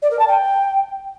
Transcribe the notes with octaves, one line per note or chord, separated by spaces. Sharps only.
D5
A#4
A5
G5